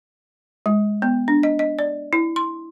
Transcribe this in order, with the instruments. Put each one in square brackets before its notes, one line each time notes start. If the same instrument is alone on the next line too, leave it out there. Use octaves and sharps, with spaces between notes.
[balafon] G#3
B3
D4
D#5
D#5
D5
E4
C6